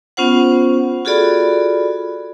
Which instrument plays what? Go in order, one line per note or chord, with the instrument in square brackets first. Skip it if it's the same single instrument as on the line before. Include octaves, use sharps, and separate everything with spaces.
[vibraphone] B3 C#4 F4 C5 F#5
F4 F#4 G#4 A4 D5 B5